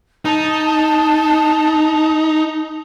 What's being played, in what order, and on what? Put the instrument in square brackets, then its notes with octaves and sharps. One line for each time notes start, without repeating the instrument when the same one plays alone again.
[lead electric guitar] D#4 [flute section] A5